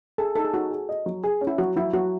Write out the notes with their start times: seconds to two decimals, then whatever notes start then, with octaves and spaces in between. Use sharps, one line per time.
0.18 G#4 A4
0.36 D#4 A4
0.45 G#4
0.54 D#4 F#4
0.71 G#4
0.89 D#5
1.06 F#3
1.24 G#4
1.41 C#4
1.47 E4
1.58 F#3 F#4
1.76 F#3 E4
1.93 F#3 F#4